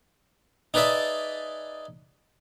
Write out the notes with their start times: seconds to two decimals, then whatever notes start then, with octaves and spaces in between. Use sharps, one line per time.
0.74 D#4 G#4 B4 D5 E5 A5